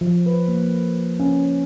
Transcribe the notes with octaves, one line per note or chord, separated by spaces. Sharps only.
F3
B4
A#3
C#4